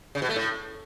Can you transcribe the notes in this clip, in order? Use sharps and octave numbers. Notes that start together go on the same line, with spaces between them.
C#3
B2
A3
A2